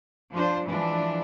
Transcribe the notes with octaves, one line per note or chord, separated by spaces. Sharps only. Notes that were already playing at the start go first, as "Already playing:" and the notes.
F3 D4 F4 C5
E3 F3 G#3 D4